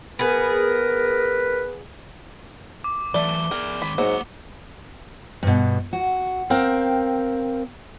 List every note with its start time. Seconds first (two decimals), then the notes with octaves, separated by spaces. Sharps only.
0.19 B3 G#4 A#4 B4
2.84 D6
3.14 E3 F#3 A3 D5 G7
3.51 G#4 A#4 D5
3.82 D#3 G#3 B5
3.98 G#2 F#3 A#3 F#5
5.43 G2 B2
5.93 F#4
6.50 C4 A#4 F5 G5